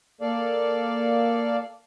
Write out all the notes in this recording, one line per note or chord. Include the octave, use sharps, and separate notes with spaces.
A#3 A4 D5 F5